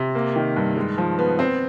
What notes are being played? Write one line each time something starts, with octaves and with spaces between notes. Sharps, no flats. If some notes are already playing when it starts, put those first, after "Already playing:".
Already playing: C3
A#3
D#3
G2
G#3
F3
B3
C4